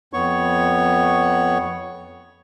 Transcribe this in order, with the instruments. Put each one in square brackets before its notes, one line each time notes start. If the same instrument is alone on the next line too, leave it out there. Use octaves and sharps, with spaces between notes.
[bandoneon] F2 B3 C#5 C#6